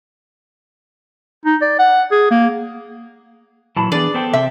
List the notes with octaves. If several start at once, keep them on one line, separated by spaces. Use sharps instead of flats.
D#4
D5
F#5
G#4
A#3
A#2 E3 F#3 A5 B5
E3 B3 D4 G#4 B4 D5
B3 A4 C5 G5 A5
C3 C4 E5 G5